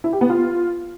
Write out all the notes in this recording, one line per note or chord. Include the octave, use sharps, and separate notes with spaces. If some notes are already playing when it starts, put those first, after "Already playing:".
E4
G4
B3
F4